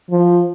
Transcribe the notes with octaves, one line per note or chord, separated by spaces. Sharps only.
F3